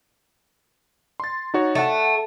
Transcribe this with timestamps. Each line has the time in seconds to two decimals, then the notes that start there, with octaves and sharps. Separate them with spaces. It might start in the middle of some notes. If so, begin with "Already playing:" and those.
1.20 C6 A6
1.54 D#4 F#4 C#5
1.75 A3 F#5 E7